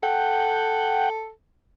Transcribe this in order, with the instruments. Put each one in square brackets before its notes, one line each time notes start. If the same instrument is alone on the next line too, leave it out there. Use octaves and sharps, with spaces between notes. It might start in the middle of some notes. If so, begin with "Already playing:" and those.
[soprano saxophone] A4 [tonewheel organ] F#5 G5